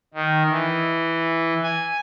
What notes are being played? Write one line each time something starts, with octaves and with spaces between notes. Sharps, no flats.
D#3
E3
G#5